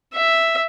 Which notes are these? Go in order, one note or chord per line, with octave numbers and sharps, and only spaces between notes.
E5